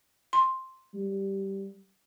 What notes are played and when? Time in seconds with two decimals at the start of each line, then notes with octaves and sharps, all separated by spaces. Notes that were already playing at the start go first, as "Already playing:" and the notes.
0.33 C6
0.94 G3